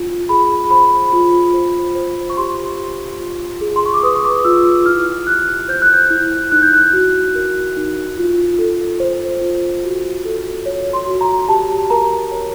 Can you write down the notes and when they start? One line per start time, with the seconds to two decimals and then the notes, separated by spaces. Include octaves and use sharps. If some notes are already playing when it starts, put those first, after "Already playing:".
Already playing: F4
0.29 G#4 B5
0.71 C5 B5
1.13 F4
1.54 C5
1.95 C5
2.30 C#6
2.37 G4 C6
2.79 G4
3.20 F4
3.61 G#4
3.76 C6
3.86 C#6
3.94 D6
4.03 B4 D#6
4.16 C#6
4.25 D6
4.35 D#6
4.44 F4 E6
4.85 E4 F6
5.27 G4 F#6
5.68 C5 G6
5.82 F#6
5.94 G6
6.10 E4
6.52 D#4 F#6
6.62 G6
6.73 F#6
6.93 F#4
7.35 A#4
7.77 D#4
8.17 F4
8.59 A4
9.00 C5
9.41 F4
9.84 F#4
10.25 A4
10.66 C#5
10.93 C6
11.07 F#4
11.21 A#5
11.48 G4 A5
11.90 A#4 A#5
12.31 C#5